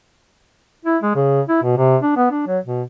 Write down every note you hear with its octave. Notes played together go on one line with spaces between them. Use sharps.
E4
G#3
C#3
E4
B2
C3
D4
B3
D4
F#3
B2